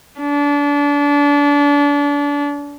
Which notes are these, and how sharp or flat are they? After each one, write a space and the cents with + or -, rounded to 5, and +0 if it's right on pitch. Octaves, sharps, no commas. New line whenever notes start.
D4 -30